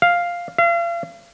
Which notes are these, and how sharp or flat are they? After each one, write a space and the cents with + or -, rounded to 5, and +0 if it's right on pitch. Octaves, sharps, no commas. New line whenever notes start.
F5 +0
F5 -40